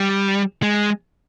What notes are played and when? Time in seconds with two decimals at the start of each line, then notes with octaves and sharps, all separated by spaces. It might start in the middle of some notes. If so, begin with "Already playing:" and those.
Already playing: G3
0.63 G#3